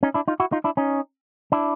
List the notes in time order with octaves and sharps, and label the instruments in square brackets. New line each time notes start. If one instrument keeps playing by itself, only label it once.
[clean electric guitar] C#4 D#4
D4 E4
D#4 F4
E4 F#4
D#4 F4
D4 E4
C#4 D#4
D4 E4